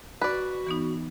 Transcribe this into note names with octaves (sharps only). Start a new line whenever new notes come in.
F#4 B4 D5
E3 B3 D#4